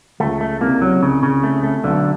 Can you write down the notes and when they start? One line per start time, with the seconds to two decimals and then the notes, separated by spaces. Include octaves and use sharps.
0.20 C#2 C#3 A3
0.41 A3
0.61 C2 C3 A#3
0.81 F#3
1.03 C#3
1.23 C#3
1.43 A3
1.63 A3
1.84 B1 B2 D3